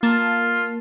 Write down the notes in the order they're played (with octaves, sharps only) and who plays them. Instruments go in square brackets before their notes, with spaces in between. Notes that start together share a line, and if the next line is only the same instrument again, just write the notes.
[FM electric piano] A#3 A5 [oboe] F4